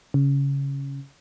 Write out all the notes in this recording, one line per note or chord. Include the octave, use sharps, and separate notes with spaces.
C#3